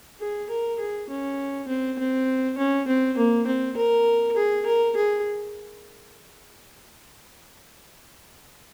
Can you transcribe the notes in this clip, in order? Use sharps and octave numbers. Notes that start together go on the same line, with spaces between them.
G#4
A#4
G#4
C#4
C4
C4
C#4
C4
A#3
C4
A#4
G#4
A#4
G#4